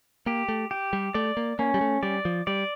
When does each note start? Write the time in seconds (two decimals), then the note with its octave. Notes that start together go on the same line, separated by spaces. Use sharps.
0.26 A#3 G4
0.48 A3
0.71 G4
0.93 G3
1.14 A3 D5
1.37 A#3
1.59 A#3 C#4
1.74 G3
1.81 A3
2.03 G3 D5
2.25 F3
2.47 G3 D5